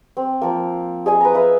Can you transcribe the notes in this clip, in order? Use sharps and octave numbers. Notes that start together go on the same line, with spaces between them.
C4
F3 A#3
G#4 D#5 G#5
B4 A#5
B4 E5 F5